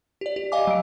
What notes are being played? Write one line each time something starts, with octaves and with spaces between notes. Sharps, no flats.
G4 D5
G4
D#5 F5 G#5 D6
F#3 D7